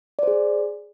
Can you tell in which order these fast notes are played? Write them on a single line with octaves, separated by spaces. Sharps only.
D5 C5 G#4